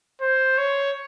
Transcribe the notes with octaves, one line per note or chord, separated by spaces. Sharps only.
C5
C#5